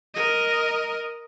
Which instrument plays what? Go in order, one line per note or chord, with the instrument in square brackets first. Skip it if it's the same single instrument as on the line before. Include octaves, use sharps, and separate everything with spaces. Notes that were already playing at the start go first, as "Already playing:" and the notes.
[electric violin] A#4 D#5